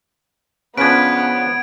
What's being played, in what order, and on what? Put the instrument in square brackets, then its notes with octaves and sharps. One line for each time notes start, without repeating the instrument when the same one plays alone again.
[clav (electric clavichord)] C#3 F3 D4 [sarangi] B3 [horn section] C#4 B4 [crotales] G#6 D7